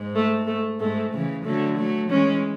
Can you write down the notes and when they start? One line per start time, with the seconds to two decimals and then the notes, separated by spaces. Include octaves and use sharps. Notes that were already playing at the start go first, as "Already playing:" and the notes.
Already playing: G#2
0.15 A3
0.47 A3
0.80 G#2 A3
1.13 C#3 E3
1.45 D3 F#3 A3
1.78 F#3 A3
2.10 E3 G#3 C#4